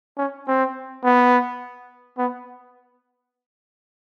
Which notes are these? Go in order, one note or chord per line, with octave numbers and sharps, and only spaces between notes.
C#4
C4
B3
B3